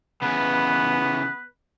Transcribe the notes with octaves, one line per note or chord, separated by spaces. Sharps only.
C#3 E3 B3 B4